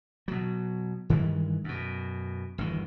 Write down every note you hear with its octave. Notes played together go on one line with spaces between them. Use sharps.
B2 F#3
G2 D#3 E3 G#3
F#2 B2
G1 E2 D#3